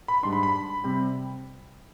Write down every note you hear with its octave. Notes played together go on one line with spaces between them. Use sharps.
B5
G#2 G3 D4 C6
B5
B5
C3 G3 C4